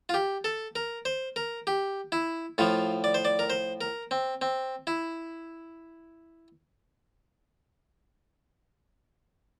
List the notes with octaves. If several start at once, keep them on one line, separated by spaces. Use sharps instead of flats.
F4
G4
A4
A#4
C5
A#4
G4
E4
A2 F3 F4
D5
C5
D5
A#4
C5
A#4
C4
C4
E4